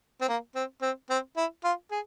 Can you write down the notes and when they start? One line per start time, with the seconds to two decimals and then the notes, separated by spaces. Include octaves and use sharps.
0.21 C4
0.28 A#3
0.55 C4
0.82 C4
1.10 C4
1.37 E4
1.64 F4
1.91 G#4